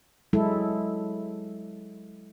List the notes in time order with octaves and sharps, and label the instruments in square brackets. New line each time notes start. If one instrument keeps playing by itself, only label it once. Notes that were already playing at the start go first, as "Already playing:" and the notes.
[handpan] F#3 G#3 E4 A4